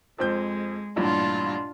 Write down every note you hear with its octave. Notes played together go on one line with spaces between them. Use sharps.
F2 G#3 C4 G6
A1 G2 A#2 D4 F4